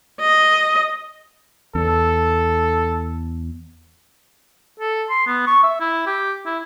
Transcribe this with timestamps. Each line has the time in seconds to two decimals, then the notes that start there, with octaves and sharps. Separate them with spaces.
0.21 D#5
1.75 E2 A4
4.80 A4
5.10 C6
5.27 B3
5.47 C#6
5.64 E5
5.80 E4
6.07 G4
6.46 E4